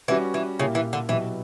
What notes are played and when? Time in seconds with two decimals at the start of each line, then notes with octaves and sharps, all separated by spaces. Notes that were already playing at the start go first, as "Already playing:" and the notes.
0.08 E3 G3 C#4 F#4
0.34 E3
0.59 A#2 C#3 A#3 E4 G4
0.75 E3
0.93 D3
1.08 B2 E3 F#3 B3 E4 G4